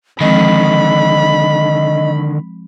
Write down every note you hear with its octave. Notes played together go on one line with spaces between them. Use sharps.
D3 D#3 F3 G#3 C4 D#5 B5